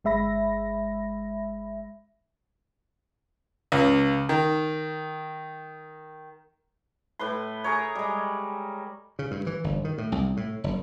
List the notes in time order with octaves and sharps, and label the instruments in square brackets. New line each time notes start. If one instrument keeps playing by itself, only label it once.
[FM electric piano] G1 G#3 E5 B5 A#6
[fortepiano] C#2
D#3
[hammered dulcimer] A2 B4 C6
G#4 A#4 C#5
G3 G#3
[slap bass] C#3
G2
E3
G1
D#3
A2
C2
A2
F#1